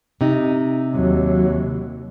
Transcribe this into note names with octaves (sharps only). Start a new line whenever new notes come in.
C3 D#4
D#2 F#3